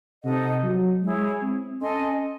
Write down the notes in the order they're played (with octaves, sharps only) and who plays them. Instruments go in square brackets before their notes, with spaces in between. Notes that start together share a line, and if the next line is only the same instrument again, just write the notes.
[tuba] C3 [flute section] D#4 A4 D#5 F#5
[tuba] F#3
[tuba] G#3 [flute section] E4 G#4 C#5
[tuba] C4
[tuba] C#4 [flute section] A4 D#5 G#5 C6